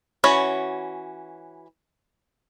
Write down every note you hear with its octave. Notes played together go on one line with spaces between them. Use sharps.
E3 C#4 F#4 C#5 B5